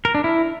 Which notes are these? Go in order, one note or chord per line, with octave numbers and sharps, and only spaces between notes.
A#4
D4
E4